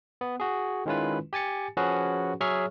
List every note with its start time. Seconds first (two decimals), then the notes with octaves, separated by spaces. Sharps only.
0.21 B3
0.40 F#4 G#4
0.86 D#3 G#3 C#4 E4 F4 B4
1.33 G4 G#5 A6 C#7
1.77 F3 C#4 F#4 G#4 B4
2.40 F#3 G#4 C#5 E5 C#6 F6